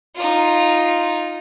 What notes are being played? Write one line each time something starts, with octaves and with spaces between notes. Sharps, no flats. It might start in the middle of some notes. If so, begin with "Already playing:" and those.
D#4 F4